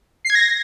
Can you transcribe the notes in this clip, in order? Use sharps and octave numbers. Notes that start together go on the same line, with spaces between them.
C7
G#6
A#6